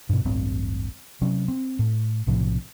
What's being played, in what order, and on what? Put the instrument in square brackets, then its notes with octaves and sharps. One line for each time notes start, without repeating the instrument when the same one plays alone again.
[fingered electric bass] G2 B2
D1 A1 G2 C4
C3 F#3 C#4
C4
A2
B1 A2 C3 F3